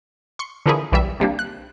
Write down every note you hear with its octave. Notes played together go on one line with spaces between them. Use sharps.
C6 C#6 C#7
D3 E3 F3 A#3 E4 G#4
B1 E3 G3 E5
C3 G3 A#3 D4
F#6